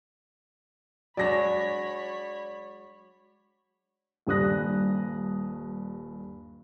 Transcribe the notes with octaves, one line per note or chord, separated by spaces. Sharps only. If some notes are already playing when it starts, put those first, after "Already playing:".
F#3 G#3 D4 C#5 D5 B5 A#6
D#1 G2 D4 D#6 F#6 A#6